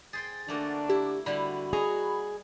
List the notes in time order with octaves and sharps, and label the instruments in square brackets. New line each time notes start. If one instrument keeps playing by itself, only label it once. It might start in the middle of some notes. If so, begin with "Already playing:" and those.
[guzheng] G#4 C5 G5 [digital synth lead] A6
[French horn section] D3 D4 [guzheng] A3 A#3 F#4
[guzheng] E4 [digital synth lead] G4
[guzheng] D3 G3 E4 [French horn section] F#4 [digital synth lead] B5
[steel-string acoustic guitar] G#4 [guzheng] C#5 D#5 A#5